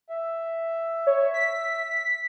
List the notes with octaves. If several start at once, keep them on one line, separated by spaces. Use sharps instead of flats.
E5
C#5
B6